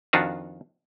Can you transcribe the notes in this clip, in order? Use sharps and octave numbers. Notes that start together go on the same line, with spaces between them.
F2 D#3 D4 F4 F#4 F#5